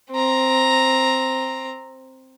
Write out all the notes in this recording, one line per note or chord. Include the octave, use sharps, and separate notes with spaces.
C4 A#5